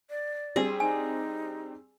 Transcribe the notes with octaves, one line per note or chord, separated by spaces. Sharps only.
D5
G3 C4 D4 G#4
D#4 G#5